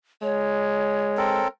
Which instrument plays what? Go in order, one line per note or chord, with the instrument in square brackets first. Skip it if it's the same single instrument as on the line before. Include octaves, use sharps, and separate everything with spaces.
[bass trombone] G#3 [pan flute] C#5
[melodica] C4 A4 A#4